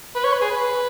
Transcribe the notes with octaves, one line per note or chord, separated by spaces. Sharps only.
B4
C#5
B4
G#4
B4